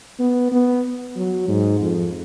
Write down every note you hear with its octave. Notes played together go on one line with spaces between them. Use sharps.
B3
B3
F#3
G#2
F2